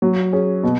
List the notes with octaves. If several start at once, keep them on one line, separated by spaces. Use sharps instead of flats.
F#3
C#4 G#4
B2